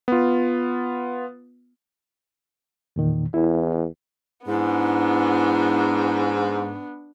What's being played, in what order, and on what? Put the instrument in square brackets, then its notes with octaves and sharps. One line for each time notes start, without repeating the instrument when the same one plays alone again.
[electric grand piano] B3 F4
[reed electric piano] E2 A#2 D#3
[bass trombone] E2 [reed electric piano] E4
[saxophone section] G#2 [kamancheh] B3 D4 [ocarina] E4